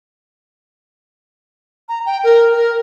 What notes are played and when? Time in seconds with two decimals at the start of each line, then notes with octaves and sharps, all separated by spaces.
1.89 A#5
2.06 G5
2.24 A#4
2.54 A#4